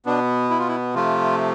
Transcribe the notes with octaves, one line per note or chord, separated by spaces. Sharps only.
B2 B3 D4
E4
F4
E4
C3 F3 A3 F4